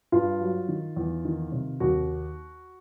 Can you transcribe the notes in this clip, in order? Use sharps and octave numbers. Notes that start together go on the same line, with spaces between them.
G2 F4
F#3
D#3
E2
D#3
C3
D#2 F#4